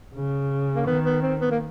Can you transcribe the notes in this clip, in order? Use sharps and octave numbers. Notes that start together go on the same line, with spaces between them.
C#3
A#3
D#3 B3
B3
C4
B3
A#3